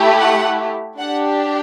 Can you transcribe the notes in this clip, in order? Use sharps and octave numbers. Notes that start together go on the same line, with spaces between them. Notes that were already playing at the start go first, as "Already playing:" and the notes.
Already playing: A3 E4 G4
F#5
D4 G4 F#5